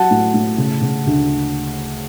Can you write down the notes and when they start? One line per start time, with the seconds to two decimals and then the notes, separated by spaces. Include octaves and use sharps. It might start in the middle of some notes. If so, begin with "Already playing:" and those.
Already playing: F#3 F#5 A5
0.11 A2
0.34 A2
0.58 C#3
0.82 C#3
1.07 D2